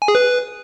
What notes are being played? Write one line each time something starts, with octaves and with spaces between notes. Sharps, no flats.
G#5
G#4
B4